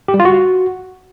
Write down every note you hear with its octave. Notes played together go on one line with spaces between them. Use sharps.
G4
G3
F4
F#4